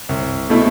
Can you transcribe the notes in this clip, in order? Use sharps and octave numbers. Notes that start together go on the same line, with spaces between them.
C2
B2 A3 E4 A4